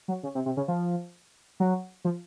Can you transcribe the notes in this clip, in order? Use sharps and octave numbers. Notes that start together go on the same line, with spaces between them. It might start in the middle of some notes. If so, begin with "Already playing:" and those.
F#3
C#3
C3
C3
C#3
F3
F#3
F3